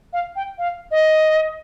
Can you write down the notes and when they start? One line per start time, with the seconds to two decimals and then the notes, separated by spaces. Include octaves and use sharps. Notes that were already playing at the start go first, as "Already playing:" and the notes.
0.13 F5
0.36 G5
0.58 F5
0.91 D#5